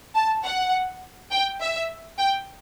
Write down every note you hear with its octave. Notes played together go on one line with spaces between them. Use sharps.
A5
F#5
G5
E5
G5